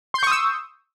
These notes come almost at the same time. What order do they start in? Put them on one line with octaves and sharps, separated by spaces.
C6 G6 C#6 D#6 E6